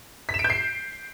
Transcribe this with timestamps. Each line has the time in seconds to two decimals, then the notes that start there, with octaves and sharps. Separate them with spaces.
0.29 B6
0.34 E7
0.39 D7
0.44 G6
0.50 C7